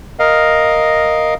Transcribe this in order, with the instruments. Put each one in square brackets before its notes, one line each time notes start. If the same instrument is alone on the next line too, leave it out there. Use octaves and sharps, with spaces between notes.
[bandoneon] A#4 D#5 F5